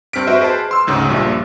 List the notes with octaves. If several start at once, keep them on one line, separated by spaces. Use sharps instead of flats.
G2 C4 F6 B6 D7
F#4 B4 C5 D#5 E5
G#4 B4 C5 A5
C6 E6
D2 G#2 C#3
A#1 G2 A#2